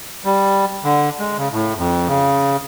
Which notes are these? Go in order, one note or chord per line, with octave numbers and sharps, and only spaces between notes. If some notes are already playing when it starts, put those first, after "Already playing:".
G3
D3
G#3
C#3
A2
F2
C#3